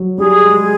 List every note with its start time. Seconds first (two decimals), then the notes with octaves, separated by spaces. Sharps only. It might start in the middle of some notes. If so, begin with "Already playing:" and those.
Already playing: F#3
0.18 G3 G#4
0.43 G#3